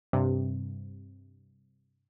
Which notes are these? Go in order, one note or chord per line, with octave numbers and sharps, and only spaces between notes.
G2 C3